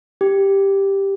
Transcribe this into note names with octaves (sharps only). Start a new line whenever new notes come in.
G4